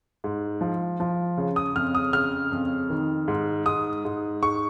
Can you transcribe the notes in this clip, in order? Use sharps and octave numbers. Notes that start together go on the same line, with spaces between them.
G#2
F3
F3
C#3
D#6
F2 F6
D#6
C#3 F6
F2
D#3
G#2
G#2 D#6
G#2
G#2 C#6